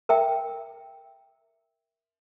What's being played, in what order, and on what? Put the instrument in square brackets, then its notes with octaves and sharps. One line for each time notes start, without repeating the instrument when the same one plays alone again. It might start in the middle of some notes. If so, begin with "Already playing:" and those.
[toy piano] A#4 E5 G5